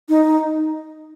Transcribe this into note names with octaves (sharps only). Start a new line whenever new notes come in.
D#4